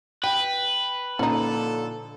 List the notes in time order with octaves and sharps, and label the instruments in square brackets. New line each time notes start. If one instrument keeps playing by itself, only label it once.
[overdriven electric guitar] B4 [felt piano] G5
[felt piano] A#2 [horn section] D3 F3 A4 [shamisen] C#4 D#4